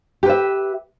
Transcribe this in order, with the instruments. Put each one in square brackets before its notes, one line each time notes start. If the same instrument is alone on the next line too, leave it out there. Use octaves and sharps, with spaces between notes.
[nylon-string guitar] G4
B4
E5